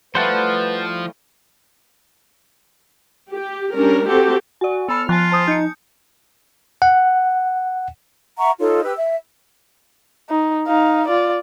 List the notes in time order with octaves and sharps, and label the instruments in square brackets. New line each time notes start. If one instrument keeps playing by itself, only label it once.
[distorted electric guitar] F3 [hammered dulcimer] G3 A3 E4 [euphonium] B4 [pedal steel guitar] C5 F#5 A5
[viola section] G4
G3 C#4 D4 A#4
C4 F#4 G4 A4
[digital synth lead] F#4 [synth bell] D5 G#5
[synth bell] B3 B5 [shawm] A4 [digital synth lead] F6
[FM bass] F3 [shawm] F4 [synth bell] G#5 A5 F#6
[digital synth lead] C5 [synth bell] A5 D#6
[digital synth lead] D#4 [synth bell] G6 C#7
[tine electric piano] F#5
[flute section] E5 F#5 A#5 C#6
D#4 F4 A4 C#5
G4 B4 E6
E5
[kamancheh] D#4
D#4 F5
F4 D5